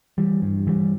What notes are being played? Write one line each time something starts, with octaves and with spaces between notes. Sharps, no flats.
E3 G3
G2
E3 G3